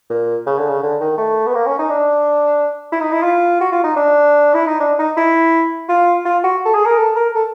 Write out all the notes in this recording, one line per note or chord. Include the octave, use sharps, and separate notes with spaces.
A#2
C#3
D3
C#3
D3
D#3
A3
B3
A#3
C#4
D#4
D4
E4
D#4
E4
F4
F#4
F4
D#4
D4
E4
D#4
D4
D#4
E4
F4
F4
F#4
A4
G#4
A#4
A4
A#4
A4